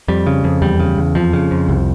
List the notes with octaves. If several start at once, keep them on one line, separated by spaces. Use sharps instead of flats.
F2 G3
C#3
F2
E2 G3
C#3
E2
F2 F3
C#3
F2
C2